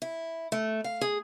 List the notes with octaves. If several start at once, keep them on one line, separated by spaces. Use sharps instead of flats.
E4
A3
F5
G#4